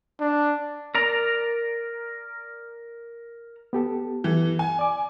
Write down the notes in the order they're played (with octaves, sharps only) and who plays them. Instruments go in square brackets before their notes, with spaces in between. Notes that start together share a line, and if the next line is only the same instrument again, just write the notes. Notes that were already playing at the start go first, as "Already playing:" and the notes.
[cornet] D4
[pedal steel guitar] A#4 D5 A#5
[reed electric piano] B3 G4 A4
[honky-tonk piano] E3
G#5
[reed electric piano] D5 D6